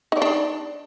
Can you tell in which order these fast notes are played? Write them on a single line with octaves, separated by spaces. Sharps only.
D#4 D5 D4